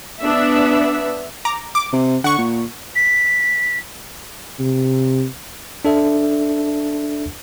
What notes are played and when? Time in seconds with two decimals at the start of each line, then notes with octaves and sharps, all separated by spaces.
0.21 B3 D4 E5
1.45 A#5 D6
1.75 D6
1.93 C3
2.24 D3 F#5 C#6
2.38 A#2
2.96 B6
4.60 C3
5.85 D4 A4 E5